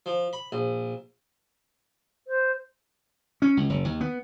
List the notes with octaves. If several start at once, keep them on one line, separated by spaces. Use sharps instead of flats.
F3
B5
A#1
C5
C#4
C#2
F#1
D#2
B3